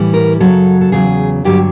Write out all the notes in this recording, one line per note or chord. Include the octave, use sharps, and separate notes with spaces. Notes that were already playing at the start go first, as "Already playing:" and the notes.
Already playing: A2 E3 G3
A#4
F#2 C#3 F#3 A4
A4
E2 C#3 F#3 G#4
G2 D3 F#3 G4